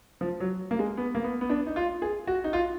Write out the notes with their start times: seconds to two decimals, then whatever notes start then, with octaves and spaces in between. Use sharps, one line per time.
0.21 F3
0.40 F#3
0.71 A#3
0.79 G#3
0.97 B3
1.15 A#3
1.24 B3
1.41 B3
1.49 D4
1.66 D#4
1.76 F4
2.02 G#4
2.27 F#4
2.44 D#4
2.53 F4